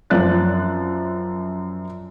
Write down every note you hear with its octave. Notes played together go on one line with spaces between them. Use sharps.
F#2 F3 D5 F#6 A6